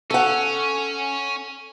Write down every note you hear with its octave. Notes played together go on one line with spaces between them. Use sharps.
C#4 A4 F#5